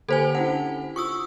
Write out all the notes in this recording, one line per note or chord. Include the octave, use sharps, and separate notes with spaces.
D3 A#3 G4 A4 C5 G#5
C#4 D4 E4 F#5
F4 C#6 D#6 E6